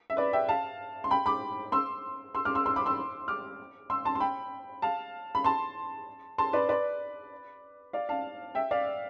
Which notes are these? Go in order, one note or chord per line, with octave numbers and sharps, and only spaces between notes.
E5
B4 D5
E5 G5
F5 A5
C6
G5 B5
B5 D6
C6 E6
C6 E6
D6 F6
C6 E6
C6 E6
B5 D6
C6 E6
D6 F6
C6 E6
A5 C6
C6
G5 B5
F5 A5
B5
A5 C6
A5 C6
B4 D5
B4 D5
D5 F5
F5 A5
E5 G5
D5 F5